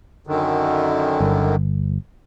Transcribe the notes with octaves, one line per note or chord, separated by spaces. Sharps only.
F#2 D3 D#3
G1